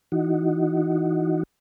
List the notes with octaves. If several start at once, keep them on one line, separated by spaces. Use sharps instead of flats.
E3 D#4 F#4